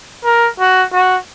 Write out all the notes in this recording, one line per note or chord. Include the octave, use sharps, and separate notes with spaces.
A#4
F#4
F#4